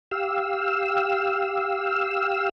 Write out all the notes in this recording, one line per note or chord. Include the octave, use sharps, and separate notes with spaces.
G4 F5 E6